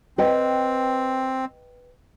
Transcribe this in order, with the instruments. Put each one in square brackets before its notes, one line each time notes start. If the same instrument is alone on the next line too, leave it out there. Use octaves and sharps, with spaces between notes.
[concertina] C4 [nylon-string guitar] B4 D#5 G5